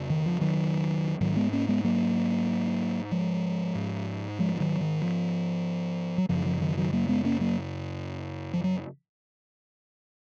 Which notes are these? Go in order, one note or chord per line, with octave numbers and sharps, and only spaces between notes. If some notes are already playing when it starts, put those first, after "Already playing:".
Already playing: F2 C#3
D#3
F3
D#3 F#3
G#2 D#3 F#3
G#3 B3
A#3 C#4
G#3 B3
F#3 A#3
F3 G#3
G#2
F3 G#3
F3
D#3 F#3
D#3
F3
F#3
F#2 C#3 F3
F3
D#3 F#3
D#3 F#3
F#3 A#3
G#3 B3
A#3 C#4
F#3 A#3
F3
F#3